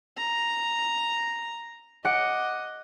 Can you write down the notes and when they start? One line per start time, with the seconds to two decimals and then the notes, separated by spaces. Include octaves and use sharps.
0.17 A#5
2.05 D#5 F#5 D6 C#7